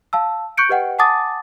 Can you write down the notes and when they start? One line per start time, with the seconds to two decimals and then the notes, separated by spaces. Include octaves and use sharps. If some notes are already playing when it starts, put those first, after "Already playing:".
0.13 F5 A5 E6
0.57 C#6 F#6 G6 C#7 D7
0.69 G4 B4 D#5 F#5 G5
0.99 F#5 G#5 A5 D6 D#6 A6